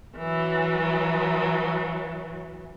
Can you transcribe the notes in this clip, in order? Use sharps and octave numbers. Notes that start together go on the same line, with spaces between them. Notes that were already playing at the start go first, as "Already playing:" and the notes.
E3 F#3